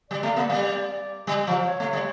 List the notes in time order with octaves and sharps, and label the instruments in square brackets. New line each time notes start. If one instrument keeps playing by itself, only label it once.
[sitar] G3 [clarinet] D5
[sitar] A3
A#3
G3
G3
F3
[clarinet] C#5
[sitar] A3
G3